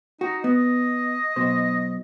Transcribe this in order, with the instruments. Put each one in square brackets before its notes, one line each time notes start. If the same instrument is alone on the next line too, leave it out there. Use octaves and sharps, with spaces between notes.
[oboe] D#4 [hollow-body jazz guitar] F#4
[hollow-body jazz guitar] B3 [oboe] D#5
[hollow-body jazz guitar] B1 B2 C5